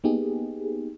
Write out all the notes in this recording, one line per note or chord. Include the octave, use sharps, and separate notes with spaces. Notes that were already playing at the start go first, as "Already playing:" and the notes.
A#3 B3 D#4 G4 G#4